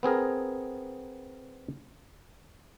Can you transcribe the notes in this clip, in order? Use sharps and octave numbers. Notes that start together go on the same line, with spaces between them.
B3 C4 G#4 A#4